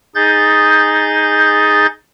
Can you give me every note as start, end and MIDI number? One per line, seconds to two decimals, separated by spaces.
0.15 1.86 63
0.15 1.86 68
0.15 1.86 91
0.15 1.86 93